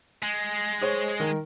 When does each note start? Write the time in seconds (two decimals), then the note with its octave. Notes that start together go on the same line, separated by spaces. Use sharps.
0.23 G#3
0.82 G#4 C5 C#5
1.20 D#3 A#4